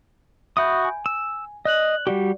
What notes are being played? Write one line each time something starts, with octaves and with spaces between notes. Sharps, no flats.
F#4 E5 B5 D#6 G6
G#5
E6
D5 D#5 F#6 F#7
G3 F#4 G4 D5